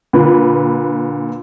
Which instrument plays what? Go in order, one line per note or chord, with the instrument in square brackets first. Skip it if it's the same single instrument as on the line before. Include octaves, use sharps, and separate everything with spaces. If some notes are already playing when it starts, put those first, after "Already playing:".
[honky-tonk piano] A#2 D3 B4